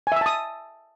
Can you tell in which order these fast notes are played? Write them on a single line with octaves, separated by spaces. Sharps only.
G#5 E5 E6 A5 D#6